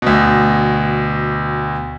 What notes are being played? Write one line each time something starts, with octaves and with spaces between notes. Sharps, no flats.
D2 B2